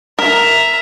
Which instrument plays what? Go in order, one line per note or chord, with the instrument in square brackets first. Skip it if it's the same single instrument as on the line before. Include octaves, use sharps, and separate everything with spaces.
[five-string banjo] A#4 [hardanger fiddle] E5 A#5